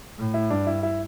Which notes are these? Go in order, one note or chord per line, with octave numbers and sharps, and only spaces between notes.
A2
E4
G2 D4
E4
E4